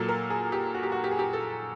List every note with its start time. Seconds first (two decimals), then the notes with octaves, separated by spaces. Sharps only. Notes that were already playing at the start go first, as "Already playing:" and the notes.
Already playing: A#2 F#3 A#3 A4
0.09 A#4
0.30 G#4
0.52 G4
0.74 F#4
0.83 G4
0.92 F#4
1.04 G4
1.11 G#4
1.19 G4
1.33 A4